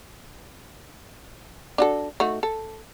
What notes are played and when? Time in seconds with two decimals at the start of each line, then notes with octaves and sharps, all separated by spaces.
1.78 D4 F#4 A4
2.20 A3 D#4 F#4
2.43 A4